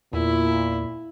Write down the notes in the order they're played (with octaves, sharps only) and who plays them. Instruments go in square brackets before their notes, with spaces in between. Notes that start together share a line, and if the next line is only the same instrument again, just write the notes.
[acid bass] E2 [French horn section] A#2 [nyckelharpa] E4